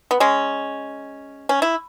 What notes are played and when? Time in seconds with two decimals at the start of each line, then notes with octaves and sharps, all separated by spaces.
0.11 B3
0.20 G#3 C#4
1.49 C#4
1.62 E4